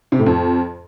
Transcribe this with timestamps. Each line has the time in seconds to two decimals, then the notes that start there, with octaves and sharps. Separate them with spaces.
0.12 C3
0.19 A2
0.26 F2